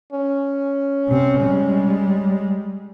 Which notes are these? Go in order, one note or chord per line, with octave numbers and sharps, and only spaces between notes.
C#4
C3 C4
G3 G#3